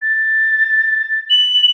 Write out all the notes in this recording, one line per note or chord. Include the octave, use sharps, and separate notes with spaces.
A6
F#7